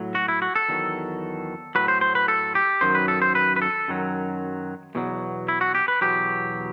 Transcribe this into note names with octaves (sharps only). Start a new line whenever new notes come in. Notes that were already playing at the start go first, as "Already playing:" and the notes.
Already playing: A2 F#3
F#4
E4
F#4
A4
E2 D#3 F#3
A2 F#3 B4
C5
C5
B4
A4
G4
F#2 D#3 F#3 C5
B4
A4
C5
B4
B4
A4
F#2 D#3 F#3
E2 B2 F#3
E4
F#4
G4
B4
E2 B2 F#3 G4